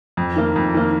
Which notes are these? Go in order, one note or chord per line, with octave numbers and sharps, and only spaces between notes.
F2
D#3 A#3
F2
D#3 A#3